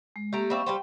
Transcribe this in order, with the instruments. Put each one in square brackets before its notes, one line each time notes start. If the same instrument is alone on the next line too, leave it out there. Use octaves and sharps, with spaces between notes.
[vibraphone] G#3
[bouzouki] A3 A#5 [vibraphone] A#3 G4
[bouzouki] G3 C4 E5 [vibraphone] F5 C#6
[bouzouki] G3 B4 C5 [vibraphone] G5